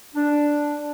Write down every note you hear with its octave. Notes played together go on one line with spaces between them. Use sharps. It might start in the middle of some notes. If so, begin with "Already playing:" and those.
D4